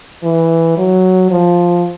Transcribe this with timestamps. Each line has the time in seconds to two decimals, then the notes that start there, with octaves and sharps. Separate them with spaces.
0.24 E3
0.77 F#3
1.30 F3